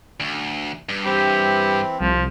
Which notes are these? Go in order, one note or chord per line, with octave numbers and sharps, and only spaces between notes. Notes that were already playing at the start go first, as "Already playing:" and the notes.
D2
G2
E3 C4 E4 G4
C2 F3 A3